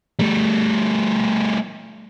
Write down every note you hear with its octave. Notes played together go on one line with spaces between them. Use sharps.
G3 A3